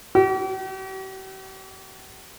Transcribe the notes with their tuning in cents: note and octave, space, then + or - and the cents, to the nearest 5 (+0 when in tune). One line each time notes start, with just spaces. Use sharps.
G4 -45